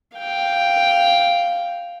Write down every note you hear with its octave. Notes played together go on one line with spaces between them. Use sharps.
F5 G5